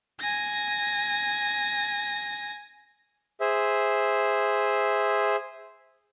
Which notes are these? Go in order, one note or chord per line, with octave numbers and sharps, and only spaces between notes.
G#5 A#6
G#4 C5 E5